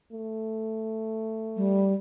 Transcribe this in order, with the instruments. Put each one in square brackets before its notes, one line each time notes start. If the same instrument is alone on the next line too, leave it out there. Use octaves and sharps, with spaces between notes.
[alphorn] A3
[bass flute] G3